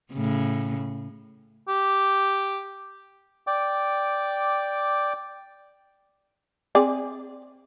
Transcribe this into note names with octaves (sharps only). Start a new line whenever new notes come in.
A2 C#3
G4
D5 G5 D6
C4 G#4 D5